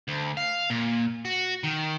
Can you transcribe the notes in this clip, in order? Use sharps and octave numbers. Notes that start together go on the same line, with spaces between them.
D2
F5
A#2
F#4
D#3